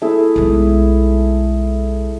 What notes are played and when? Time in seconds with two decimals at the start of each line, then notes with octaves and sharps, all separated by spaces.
0.02 A3 E4 G#4
0.36 B1 G#3